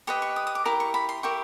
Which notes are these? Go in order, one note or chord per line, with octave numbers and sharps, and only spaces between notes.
G4 B4 D#5 C#6
C#6
D#6
D#6
D6
E4 G4 A#4 D6
C#6
B5
C6
E4 G4 A#4 C#6